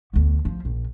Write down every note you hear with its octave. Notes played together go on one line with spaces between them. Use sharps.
D2 B3
F3
A#1